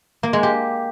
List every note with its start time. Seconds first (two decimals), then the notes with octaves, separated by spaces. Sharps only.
0.23 A#3
0.33 G#3
0.43 G4